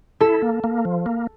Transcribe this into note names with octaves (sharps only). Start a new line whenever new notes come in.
E4 A4
A#3
A#3
F3
A#3